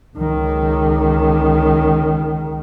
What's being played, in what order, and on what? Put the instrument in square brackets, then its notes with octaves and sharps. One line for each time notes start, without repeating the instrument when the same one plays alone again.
[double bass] C#2 D#3